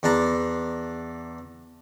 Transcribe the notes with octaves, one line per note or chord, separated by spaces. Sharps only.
E2 D4 D5 A#5